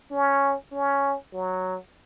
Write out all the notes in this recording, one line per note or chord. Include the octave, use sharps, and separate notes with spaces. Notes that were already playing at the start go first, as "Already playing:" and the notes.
C#4
C#4
F#3